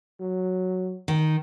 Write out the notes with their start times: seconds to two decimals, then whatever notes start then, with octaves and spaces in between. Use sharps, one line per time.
0.20 F#3
1.08 D#3